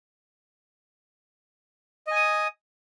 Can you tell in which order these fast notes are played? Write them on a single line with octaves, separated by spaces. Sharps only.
D#5 G#5 D#6